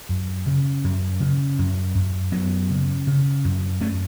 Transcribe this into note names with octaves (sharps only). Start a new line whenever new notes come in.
F#2
C#3
F#2
C#3
F#2
F#2
F#2 F#3 B3
C#3
C#3
F#2
F#2 A3 C#4